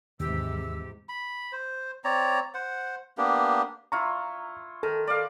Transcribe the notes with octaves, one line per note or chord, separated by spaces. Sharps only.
D#2 G#2 C3 E3 G4 E6
B5
C5
C4 C#5 D5 A#5
C5 F#5
A#3 B3 D4 G4
E4 F4 A#5 C#6
D#3 A4
D5 F5